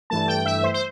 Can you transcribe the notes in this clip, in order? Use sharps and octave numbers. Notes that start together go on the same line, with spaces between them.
G2 E3 A3 A5
G5
E5
C5
C5